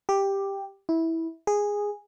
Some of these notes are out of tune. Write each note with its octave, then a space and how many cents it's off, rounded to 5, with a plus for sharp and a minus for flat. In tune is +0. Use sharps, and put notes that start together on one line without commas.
G4 +5
E4 -15
G#4 -10